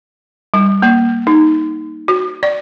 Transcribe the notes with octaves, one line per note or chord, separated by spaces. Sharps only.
G3
A#3
D#4
F#4
D5